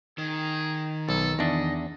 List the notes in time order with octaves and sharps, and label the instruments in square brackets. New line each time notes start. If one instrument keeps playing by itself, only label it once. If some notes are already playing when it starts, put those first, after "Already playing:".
[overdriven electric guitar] D#3 [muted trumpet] G#4
[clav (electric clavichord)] B1 [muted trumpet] A4
[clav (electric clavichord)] E2 D4 [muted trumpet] D#5